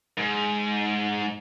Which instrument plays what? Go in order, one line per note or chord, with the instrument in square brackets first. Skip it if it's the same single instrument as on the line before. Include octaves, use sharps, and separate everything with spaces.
[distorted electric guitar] G#2